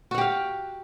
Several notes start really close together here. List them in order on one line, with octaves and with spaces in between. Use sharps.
F#4 F#5 G4 F5